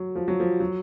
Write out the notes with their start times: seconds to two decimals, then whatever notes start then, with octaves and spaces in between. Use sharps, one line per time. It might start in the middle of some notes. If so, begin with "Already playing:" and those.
Already playing: F#3
0.15 F3
0.28 F#3
0.40 F3
0.60 F#3